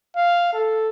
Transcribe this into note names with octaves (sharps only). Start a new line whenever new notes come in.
F5
A4